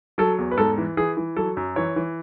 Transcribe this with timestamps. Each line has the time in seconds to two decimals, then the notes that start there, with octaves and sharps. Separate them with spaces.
0.18 F#3 A4
0.39 E2
0.51 B4
0.57 G#2 A4
0.78 E3
0.97 E3 G#4
1.17 E3
1.36 F#3 A4
1.57 F#2
1.76 E3 C#5
1.96 E3